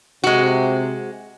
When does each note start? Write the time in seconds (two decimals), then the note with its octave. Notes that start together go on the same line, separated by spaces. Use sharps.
0.24 C3 G#3 F#4